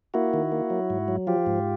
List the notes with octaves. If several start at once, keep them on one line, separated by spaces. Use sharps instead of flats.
A#3 E4 F#4
D#3
A#3
F#3
G#2
F#3
F3 F4 G4
G#2